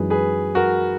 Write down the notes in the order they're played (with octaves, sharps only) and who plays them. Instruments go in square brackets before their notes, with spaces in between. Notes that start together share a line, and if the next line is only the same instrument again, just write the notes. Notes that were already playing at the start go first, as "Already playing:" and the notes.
Already playing: [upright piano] F#2 E3 G#3 D#4 [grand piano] G#4 B4
[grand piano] G#4 B4
F#4 A#4